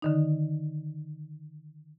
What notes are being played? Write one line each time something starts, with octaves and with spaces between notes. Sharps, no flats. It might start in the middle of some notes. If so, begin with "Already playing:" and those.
D3 D#3 D#4